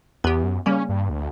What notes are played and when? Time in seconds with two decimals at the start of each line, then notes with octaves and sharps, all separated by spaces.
0.24 E2 B3 G4
0.43 F#2
0.66 C#3 G3 A#3 C#4
0.89 G2
1.10 D2